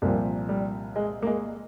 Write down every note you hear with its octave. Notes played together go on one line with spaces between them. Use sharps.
C2 A#2 F3 G3 A#3
G3
G#3
A#3
G#3